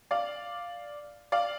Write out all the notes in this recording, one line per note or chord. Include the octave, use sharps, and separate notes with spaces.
D5 F5
D5 F5